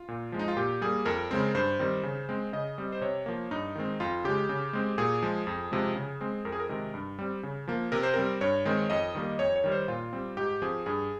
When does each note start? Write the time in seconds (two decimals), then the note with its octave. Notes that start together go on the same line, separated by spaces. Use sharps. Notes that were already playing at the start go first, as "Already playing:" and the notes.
Already playing: F4
0.08 A#2
0.32 F3 G#3
0.39 D#4
0.48 F4
0.56 A#2 G4
0.81 G3 A#3 G#4
1.05 F2 A#4
1.31 C#3 G#3 C4
1.55 G2 C5
1.79 D#3 G3 C4
2.03 C#3
2.29 G#3 C4
2.53 C#3 D#5
2.78 G3 C4
2.92 C5
3.01 C3 C#5
3.26 F3 A#3
3.51 G2 D#4
3.75 D#3 G#3 C4
4.00 F2 F4
4.24 C#3 G#3 G4
4.49 C#3
4.73 G#3 C4
4.98 A#2 G#4
5.22 F3 G#3
5.47 F2
5.72 C3 F3 G#3
5.96 C#3
6.21 G#3 C4
6.45 F2 A#4
6.52 G#4
6.60 A#4
6.69 C3 D#3 G#3
6.94 G2
7.19 G3 C4
7.43 C#3
7.68 F3 A#3
7.92 C3 A#4
8.03 C5
8.14 G3 C4 A#4
8.41 G2 C#5
8.65 D#3 G#3 C4
8.90 F2 D#5
9.15 D#3 G3 A#3
9.39 F2 C#5
9.56 C#5
9.64 D#3 G3
9.72 C5
9.88 A#2 F4
10.13 G3 C4
10.37 G#2 G4
10.62 F3 C4 G#4
10.86 G2 G#4